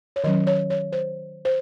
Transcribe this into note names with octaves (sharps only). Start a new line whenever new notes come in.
C#5
D#3 F#3 C#4 D#5
C#5
C#5
C5
C5